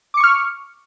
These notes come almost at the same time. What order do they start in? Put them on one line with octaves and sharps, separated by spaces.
D6 C#7 C#6 F6